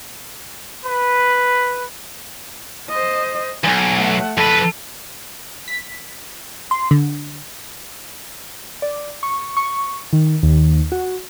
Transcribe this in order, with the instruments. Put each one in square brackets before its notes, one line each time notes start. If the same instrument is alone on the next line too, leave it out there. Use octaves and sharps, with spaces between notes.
[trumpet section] B4
[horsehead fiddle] C5 D#5
[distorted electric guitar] B1 E2 [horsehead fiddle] G#5
[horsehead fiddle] A3 F#5
[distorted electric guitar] F2 B4 [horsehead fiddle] A4
[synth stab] B6
C6
D3
[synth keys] D5
C#6
C#6
D#3
D#2
F#4